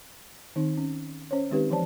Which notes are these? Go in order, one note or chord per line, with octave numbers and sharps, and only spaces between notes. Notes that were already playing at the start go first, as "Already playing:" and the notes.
D#3 C4 D#4
C#4
C#4 C5 C#5
D#3 G#3 C4 D#4 G4 B4
E3 F3 C5 D5 A5